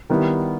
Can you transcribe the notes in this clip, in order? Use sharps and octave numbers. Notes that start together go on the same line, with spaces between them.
D#3 G3 B3 E4